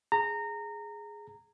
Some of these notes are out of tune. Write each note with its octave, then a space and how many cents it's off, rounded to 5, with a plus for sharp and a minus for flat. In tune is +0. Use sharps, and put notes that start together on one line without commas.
G#4 +0 A#5 -20